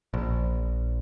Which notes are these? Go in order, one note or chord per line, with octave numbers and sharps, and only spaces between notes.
A#1